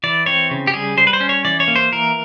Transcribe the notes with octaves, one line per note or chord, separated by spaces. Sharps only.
E3 D5
C4 C#5
C#3
G4
G3 G#4
G3 C5
B4
C5
C#4
C#5
E3 D5
C#5
A#3
C5
E3 A#4